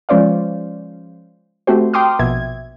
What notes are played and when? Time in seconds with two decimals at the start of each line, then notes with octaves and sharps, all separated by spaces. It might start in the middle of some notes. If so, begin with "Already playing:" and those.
0.09 F3 G#3 C#4 C5 D5 F5
1.67 A3 C4 F#4 G4 C5
1.94 G5 A#5 C6 D6 D#6 F6
2.19 A#1 B2 E5 G#6